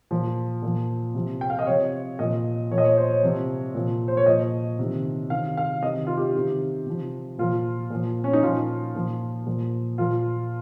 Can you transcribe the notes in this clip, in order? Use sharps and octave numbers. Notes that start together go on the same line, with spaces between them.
A#2 F3
A#2 F3
C3 F3
G5
F5
D#5
C3 F3 C#5
A#2 F3 D#5
A#2 F3 C#5
D#5
C#5
C5
C#5
C3 F3
A#2 F3
C5
C#5
A#2 F3 D#5
C3 D#3
C3 D#3 F5
F5
C3 D#3 D#5
F4
G4
C3 D#3
C3 F3
A#2 F3 F4
A#2 F3
C#4
D#4
A#2 F3 F4
A#2 F3
A#2 F3
A#2 F3 F4